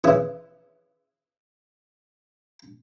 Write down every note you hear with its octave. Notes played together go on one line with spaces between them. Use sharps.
C#3 E3 E4 D#6